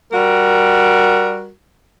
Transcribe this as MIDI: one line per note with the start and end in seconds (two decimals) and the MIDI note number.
0.12 1.50 55
0.12 1.50 66
0.12 1.50 70